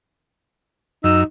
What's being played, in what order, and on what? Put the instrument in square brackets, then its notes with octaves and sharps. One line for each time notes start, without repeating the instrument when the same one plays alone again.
[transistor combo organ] F#2 [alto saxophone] D#4 [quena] E6